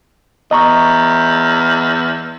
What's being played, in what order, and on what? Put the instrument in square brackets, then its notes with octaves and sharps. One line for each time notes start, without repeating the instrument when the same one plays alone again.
[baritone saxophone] E2 [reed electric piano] D#5 A#5 C#6